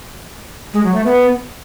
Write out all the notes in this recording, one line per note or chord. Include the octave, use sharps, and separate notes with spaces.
G#3
F#3
A3
B3